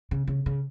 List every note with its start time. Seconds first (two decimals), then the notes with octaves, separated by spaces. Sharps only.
0.11 C#3
0.27 C#3
0.46 C#3